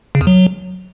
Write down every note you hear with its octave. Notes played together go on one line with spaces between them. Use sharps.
C#3
E2
F#3